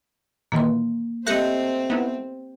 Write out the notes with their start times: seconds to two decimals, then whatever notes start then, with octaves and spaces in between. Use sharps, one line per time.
0.52 A#2 D#3 E3 A#3 C6
1.27 A3 C4 G4 C5 D#5 F#6 A#6 C#7
1.90 B3 D#4 E4